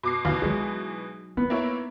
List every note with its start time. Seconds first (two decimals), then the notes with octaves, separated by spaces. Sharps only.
0.03 B2 D6 C7
0.25 D#2 B2 E3 F5
0.42 F#3 G#3 D#4
1.37 B3 D#4
1.50 A#3 E4 C#5